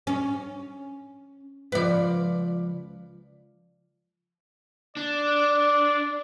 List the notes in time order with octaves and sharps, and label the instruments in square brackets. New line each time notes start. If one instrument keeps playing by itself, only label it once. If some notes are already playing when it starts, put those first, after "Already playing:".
[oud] C#4
[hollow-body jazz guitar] C#2 F3 [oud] B4 D5
[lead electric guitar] D4 [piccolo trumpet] D5